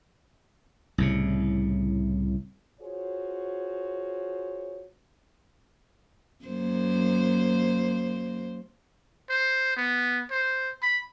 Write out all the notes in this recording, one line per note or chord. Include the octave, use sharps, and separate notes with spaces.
C2 A2 C#3
F4 F#4 G#4 C5 C#5
F#2 A#3 C5
C5
B3
C5
B5